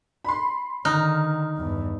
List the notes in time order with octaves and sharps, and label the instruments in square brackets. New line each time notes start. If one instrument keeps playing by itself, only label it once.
[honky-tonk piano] B5 C6
[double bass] D3 D#3 [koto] D#4 [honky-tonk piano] A#5 F6
[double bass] E2 G2